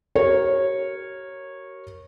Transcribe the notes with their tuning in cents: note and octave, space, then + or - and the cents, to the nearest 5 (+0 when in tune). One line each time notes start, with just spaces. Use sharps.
F#4 +45 A#4 +0 C#5 -15